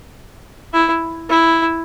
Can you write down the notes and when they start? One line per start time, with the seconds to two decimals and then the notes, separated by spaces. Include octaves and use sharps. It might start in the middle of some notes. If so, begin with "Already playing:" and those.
0.73 E4
1.29 E4